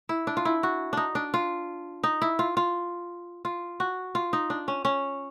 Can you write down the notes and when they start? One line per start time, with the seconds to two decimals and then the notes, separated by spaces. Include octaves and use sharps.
0.09 E4
0.27 D4
0.37 F4
0.45 E4
0.63 F#4
0.93 D4 D#4
1.15 D4
1.34 F4
2.03 D#4
2.22 E4
2.39 F4
2.57 F4
3.45 F4
3.80 F#4
4.15 F4
4.33 D#4
4.50 D4
4.68 C#4
4.85 C#4